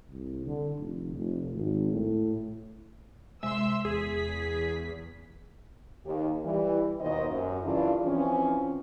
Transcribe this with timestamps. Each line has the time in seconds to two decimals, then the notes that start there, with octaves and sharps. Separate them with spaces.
0.11 C2
0.47 D3
0.78 F1
1.17 F1
1.55 G#1
1.92 A2
3.43 C3 G#3 E5 C6 E6
3.85 E2 G#4 B6
6.06 D#2 G4
6.45 E3 G3
7.00 D#2 B2 D#3 C5 D#5
7.30 F#2
7.64 G2 C#3 E3 D4 F4 D5
8.04 E3 F3 C4 C#4